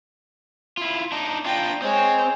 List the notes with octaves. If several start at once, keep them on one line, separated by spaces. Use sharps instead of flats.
E4 F4
D4 D#4
D4 F4 G5 A#5
G#3 C4 C#5